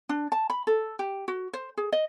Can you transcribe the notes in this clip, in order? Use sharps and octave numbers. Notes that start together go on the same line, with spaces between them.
D4
A5
B5
A4
G4
F#4
C5
G#4
D#5